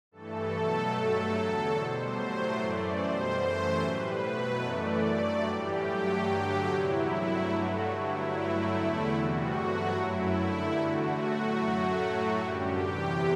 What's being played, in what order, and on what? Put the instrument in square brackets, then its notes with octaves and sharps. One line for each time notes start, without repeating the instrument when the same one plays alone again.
[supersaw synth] G2 E3 A3 A4
B2 F#3 A3
G2 F#3 A3 A4
E2 D3 F#3
B2 G3 C5
A2 F#3 A3
F#2 E3 A3 D5
B2 G3 C5
F#2 E3 A3
A2 G3 B4
B2 F#3 A3
F#2 E3 A3 D5
G2 F#3 A3
A2 E3 G3 G4
G2 F#3 A3
G2 D3 F#3
E2 C3 F#3 E4
G2 F#3 A3
G2 F#3 A3 F#4
G2 D3 F#3 E4
G2 F#3 A3
E2 D3 A3
E2 C3 E3 G3 F#4
G2 F#3 A3 F#4
F#2 F#3 A3 E4
G2 D3 A3
E2 D3 A3 F#4
A2 F#3 A3
F#2 F#3 A3
A2 F#3 A3
F#2 D3 G3 G4
E2 C3 E3